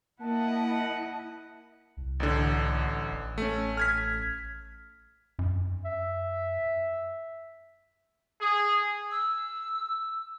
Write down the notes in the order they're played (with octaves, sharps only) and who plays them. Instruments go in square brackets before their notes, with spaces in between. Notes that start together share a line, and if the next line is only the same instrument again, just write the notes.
[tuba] A#3 [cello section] E4 D#5 [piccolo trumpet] F#5 [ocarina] A5
[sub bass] C2
[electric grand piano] A1 D3
[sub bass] A1
[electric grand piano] A3 C#4
F6 G#6 B6
[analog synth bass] F#2
[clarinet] E5
[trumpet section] G#4
[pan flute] E6